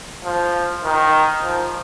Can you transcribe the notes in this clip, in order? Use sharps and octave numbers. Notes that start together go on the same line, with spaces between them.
F3
D#3
F3